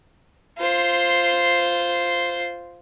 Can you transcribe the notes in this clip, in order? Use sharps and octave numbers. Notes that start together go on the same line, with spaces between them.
F4 C5